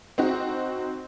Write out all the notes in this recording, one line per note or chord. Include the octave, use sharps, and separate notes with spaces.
C4 D#4 F#4